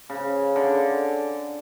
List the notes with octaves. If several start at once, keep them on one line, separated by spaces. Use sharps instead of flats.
C#3
D3